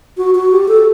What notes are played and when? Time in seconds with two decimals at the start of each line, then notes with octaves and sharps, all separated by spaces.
0.17 F#4
0.35 F#4
0.52 G4
0.68 A4